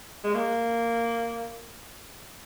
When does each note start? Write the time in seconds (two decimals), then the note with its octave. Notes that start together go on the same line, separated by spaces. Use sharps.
0.24 G#3
0.34 A#3